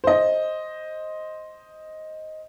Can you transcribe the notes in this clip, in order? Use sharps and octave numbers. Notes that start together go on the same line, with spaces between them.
C5 D#5